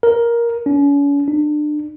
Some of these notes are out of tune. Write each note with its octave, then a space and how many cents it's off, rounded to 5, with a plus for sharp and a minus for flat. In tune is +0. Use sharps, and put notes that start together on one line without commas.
A#4 +10
C#4 +40
D4 +30